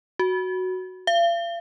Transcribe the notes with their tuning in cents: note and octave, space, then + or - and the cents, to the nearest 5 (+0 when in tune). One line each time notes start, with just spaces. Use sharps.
F#4 +0
F5 -40